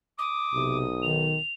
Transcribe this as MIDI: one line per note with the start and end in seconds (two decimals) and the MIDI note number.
0.18 0.77 86
0.18 1.05 87
0.54 1.39 35
0.54 0.85 48
1.02 1.37 51
1.02 1.53 101